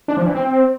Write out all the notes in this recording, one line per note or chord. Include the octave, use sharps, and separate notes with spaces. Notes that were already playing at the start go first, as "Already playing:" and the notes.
D4
F3
E3
C4